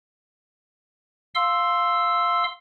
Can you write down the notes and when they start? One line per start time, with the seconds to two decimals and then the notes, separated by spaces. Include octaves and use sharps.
1.35 F5 C6 E6